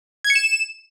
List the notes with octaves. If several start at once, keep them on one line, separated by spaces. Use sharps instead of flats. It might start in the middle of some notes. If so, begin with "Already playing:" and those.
G#6
C#7
E7